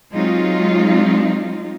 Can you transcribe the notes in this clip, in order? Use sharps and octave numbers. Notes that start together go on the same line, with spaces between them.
F#3 G#3 C4 D#4 F4